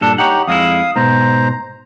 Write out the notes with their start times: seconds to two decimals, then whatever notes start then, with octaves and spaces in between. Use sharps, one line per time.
0.01 G2 A#2 D4 A4
0.18 D#4 G4 C#5 F#5
0.47 F2 G#3 E4 F5 D#6
0.96 G#2 B2 C5 A#5